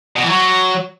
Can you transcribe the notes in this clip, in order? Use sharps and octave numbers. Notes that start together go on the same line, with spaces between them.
B2
E3
F#3